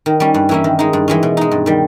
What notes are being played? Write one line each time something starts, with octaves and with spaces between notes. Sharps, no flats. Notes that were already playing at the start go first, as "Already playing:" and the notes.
D#3
G3 C#4
G2
E3 A#3 C#4 E4
D#3
G#3 D#4
G2
E3 G#3 C#4
B2
G#3 D#4
G2
D#3 G3